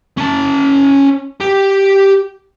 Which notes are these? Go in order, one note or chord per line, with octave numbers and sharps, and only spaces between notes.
C#4 A5
G4